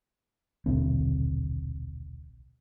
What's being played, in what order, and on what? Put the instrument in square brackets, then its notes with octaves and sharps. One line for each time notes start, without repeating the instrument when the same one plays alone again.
[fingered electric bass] D#1 B1 D3 C4